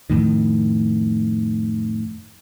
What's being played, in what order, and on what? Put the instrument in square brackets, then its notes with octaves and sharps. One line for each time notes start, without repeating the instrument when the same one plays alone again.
[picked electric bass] F2 A2 D#3